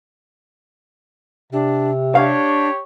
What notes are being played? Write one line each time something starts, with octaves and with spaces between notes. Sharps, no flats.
C3 D4
D4 G4 C#5 F5